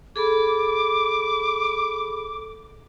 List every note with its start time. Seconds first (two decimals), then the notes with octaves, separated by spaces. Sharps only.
0.16 G#4 A4 B5 D6